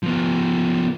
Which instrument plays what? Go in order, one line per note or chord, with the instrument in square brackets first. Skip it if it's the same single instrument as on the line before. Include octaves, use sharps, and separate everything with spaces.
[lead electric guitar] F3 B3